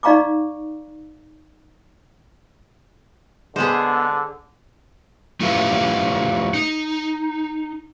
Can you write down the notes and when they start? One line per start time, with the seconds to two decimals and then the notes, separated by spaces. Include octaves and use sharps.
0.03 D#4 D5 F5 A#5 C#6 D6
3.56 D3 G#3 B3 G#4 C5
5.40 A3 E4 F4 G4 B4
6.54 D#4